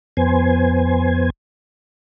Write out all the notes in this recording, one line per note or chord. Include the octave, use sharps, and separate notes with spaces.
F2 B3 C5 G#5